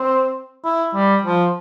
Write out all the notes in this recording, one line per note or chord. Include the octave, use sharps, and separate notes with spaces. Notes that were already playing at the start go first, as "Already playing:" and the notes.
Already playing: C4
E4
G3
F3